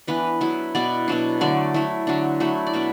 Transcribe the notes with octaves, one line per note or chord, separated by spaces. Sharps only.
E3 B3 D4 B4
F#3 B3 E4
B2 B3 E4 D5
B2 F#3 D4
D3 F#3 A3 D5
F#3 A3 E4
D3 F#3 D4
F#3 A3 E4
D5
B2 B3 D4 E5